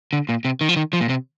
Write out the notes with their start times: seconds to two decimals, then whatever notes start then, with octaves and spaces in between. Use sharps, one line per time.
0.13 D3
0.29 A#2
0.45 C3
0.61 D#3
0.69 F3
0.76 D#3
0.93 F3
1.01 A#2
1.09 C3